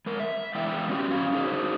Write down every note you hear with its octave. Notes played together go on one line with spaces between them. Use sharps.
G#3 A#4
E5
E3 G#3 E4 D5 F5 G5
C#4 F#4 G4
F#2 C#4 F5
D4 D#4 F#4 G#4 A4 C5